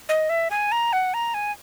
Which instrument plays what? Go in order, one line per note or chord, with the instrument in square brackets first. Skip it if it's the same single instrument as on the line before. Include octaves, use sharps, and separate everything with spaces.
[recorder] D#5
E5
G#5
A#5
F#5
A#5
G#5